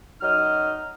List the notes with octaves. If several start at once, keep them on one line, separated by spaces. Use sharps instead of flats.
F#2 F#3 D#4 D#5 F6